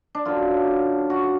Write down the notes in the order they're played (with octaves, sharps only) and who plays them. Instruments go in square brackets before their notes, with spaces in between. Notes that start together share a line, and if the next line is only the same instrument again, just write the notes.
[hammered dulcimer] D4
F#2 D3 F#3 F4
F#4